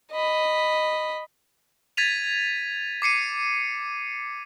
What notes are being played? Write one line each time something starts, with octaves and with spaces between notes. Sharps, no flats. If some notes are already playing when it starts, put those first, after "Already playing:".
D#5 B5
G#6 A6 B6 D#7 F7
D6 C7 C#7 D#7